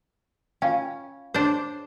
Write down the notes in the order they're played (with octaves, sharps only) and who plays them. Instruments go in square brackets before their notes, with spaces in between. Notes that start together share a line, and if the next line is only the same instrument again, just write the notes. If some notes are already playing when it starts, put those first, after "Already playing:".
[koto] C#4 [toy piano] F4 F5 G5
[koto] D4 C5 [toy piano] G#4 C#5